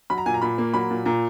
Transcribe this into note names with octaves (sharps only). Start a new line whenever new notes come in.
F#3 B5
A#5
A#2 G#5
A#5
A#2 B5
A#3
F#3 B5
A#2
A#2 A#5